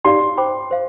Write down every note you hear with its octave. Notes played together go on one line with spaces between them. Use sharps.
D#4 G4 D5 F5 C6
C5 G5 B5 D6
C5 F5